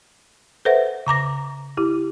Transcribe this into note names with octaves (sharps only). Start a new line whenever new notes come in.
A4 B4 C5 E5 F#5
C#3 A#5 D6 A#6
E4 G4